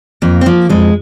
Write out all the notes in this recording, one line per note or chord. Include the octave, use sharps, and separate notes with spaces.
F2 A#3
C4
F3 A#3
F2 G#3